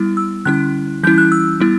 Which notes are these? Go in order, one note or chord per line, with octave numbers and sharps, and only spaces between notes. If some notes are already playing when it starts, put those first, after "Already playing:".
Already playing: G3 B3 E4
E6
D3 G3 C#4 E4 F#6
E3 G3 C#4 E4 G6
F#6
E6
G3 B3 E4